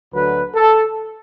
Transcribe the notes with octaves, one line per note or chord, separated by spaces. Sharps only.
D2 D3 F#3 B4
A4